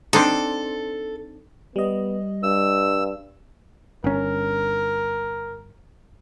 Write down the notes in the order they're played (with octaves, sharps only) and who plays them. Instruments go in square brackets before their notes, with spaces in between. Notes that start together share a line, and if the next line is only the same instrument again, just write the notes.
[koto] C4 D4 D#4 [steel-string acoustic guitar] A4
[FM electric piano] G3 D#5 [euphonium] B3
[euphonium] G2 [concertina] E6
[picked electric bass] G1 C#4 [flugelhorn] A#4